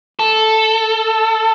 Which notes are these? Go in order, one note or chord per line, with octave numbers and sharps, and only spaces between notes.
A4